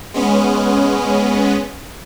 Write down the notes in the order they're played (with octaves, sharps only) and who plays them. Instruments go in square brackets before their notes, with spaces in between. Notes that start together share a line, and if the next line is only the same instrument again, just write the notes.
[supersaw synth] G#3 B3 C#4